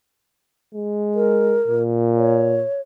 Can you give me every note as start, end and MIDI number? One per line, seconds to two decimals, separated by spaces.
0.75 1.59 56
1.15 1.83 70
1.68 2.63 46
2.17 2.81 73